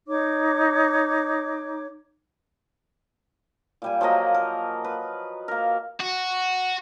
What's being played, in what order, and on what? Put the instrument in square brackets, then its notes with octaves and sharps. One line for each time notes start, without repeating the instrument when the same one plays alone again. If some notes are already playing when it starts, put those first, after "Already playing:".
[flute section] D#4 C#5 D6
[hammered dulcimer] A#2 G3 G#5
F3 F#3 A#3 D#5
A#4
B4
A#3 A#4
[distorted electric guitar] F#4